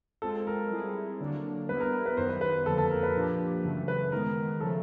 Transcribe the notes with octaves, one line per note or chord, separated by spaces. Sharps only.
G#3 C4 F4 A4
A#4
G3 C4 E4 G#4
D3 F#3 A#3 D4
G3 B3 E4 B4
A#4
B4
F#2 D#3 G3 B3 C5
B4
B4
F2 D3 F3 A#3 A4
A4
A#4
B4
A#2 F3 A#3 D4 G4
F#2 C#3 E3 A3
B4
D#3 G#3 B3 A#4
C#3 F3 A3 A4